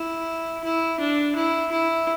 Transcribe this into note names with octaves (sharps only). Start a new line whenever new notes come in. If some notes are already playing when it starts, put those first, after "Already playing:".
Already playing: E4
E4
D4
E4
E4